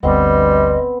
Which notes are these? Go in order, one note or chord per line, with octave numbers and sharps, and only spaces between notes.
G1 D2 G3 B3 C4 C5 D#5